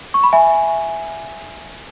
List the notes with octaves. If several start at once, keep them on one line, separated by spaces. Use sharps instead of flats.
C#6
B5
E5 G#5